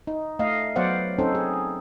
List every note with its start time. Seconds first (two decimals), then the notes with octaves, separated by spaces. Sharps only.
0.07 D#4
0.39 A3 D#5 F5
0.76 F#3 B3 C5 D5 F5 F#5
1.18 C4 C#4 D#4 A4 C5
1.35 G#4